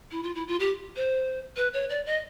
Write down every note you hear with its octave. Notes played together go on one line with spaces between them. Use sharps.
E4
F4
E4
F4
G4
C5
B4
C#5
D5
D#5